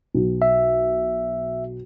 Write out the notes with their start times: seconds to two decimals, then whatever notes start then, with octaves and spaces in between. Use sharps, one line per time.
0.14 B1
0.42 E5